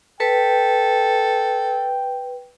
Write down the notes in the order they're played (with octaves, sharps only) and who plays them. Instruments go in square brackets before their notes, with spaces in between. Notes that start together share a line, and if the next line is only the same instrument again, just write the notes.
[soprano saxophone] A4 [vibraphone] B4 [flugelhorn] G5